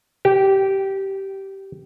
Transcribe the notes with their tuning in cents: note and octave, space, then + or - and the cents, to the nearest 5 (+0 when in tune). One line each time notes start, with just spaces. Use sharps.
G4 -15